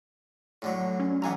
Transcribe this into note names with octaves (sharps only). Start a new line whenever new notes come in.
A2 D3 F#3
C#4
B1 E3 B3 F5 G#5 A#5